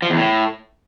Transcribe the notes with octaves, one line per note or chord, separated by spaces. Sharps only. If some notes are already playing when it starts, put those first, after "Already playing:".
F3
E2
A2